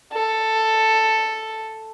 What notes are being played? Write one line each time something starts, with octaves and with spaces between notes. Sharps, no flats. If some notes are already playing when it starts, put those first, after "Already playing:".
A4